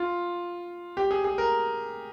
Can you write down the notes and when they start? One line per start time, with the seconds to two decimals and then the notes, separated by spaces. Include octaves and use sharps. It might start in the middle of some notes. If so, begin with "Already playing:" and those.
Already playing: F4
0.97 G4
1.11 G#4
1.24 G#4
1.38 A#4